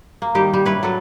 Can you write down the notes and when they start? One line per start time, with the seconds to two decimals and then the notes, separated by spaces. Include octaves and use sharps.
0.22 A#3
0.35 D#3 G3 G4
0.54 G3
0.65 E4 B4 C#5
0.83 F#3 A4 B4